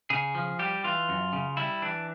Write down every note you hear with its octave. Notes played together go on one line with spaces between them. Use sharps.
C#3 G#4
F3
G3 G4
E3 F4
F#2
C#3
G3 E4
E3 D4